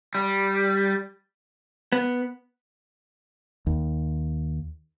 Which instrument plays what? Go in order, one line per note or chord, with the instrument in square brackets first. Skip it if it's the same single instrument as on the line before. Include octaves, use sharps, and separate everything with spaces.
[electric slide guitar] G3
[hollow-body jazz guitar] B3
[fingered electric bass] D#2